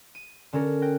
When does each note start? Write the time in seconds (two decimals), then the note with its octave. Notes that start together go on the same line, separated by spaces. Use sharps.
0.15 D#7
0.53 D3 C#4 A4 A#4
0.82 G5 F#6 A#6